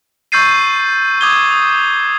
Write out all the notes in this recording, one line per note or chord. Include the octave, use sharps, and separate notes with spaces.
C#6 E6 G6 A6 C7 D#7
D6 D#6 G#6 G7
D#6